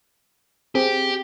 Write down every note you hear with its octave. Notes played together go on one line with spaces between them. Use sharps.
C4 G4 G#4